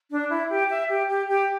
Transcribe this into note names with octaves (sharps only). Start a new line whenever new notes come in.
D4
E4
G4
E5
G4
G4
G4